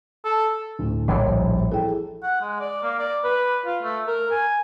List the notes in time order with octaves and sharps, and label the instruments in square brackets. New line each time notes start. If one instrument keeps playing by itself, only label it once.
[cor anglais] A4
[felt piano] D2 A2 A3
[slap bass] A#1 E3 G3 [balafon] F3 C#5
[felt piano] E4 A4 [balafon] G#4 G5
[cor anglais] F#5
G#3
D5
A#3
D5
B4
F4
A3
A#4
G#5